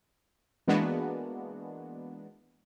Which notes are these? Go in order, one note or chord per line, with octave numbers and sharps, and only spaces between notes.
E3 G#3 A#3 B3 D4 F#4